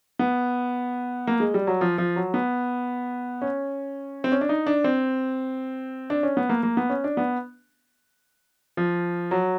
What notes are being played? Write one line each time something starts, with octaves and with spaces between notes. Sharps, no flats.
B3
A#3
G#3
G3
F#3
F3
F3
F#3
B3
C#4
C4
C#4
D4
D#4
D4
C4
D4
C#4
B3
A#3
A#3
B3
C#4
D4
B3
F3
F#3